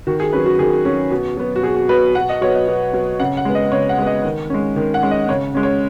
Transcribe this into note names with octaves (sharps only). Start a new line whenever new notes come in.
D#3 F#4
G#4
F#3 C#4 B4
F#4
D#3 G#4
F#3 C#4
B2
F#3 B3
F#4
B2 G#4
F#4
F#3 B3 B4
B2 F#5
D#5
F#3 B3 C#5
D#5
B2
F#3 B3
C#3 F#5
F#5
G#3 B3
D#5
C#3 C#5
F#5
G#3 B3
D#5
D#3
G#3 C#4
D#3
F#5
G#3 C#4
D#5
C#3 C#5
G#3 C#4
C#5